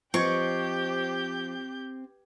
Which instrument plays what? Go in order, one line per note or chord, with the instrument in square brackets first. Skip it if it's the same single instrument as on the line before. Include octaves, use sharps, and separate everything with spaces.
[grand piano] F3 D#5 G#6 [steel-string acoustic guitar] C4 [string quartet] G4 G6 [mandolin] C#6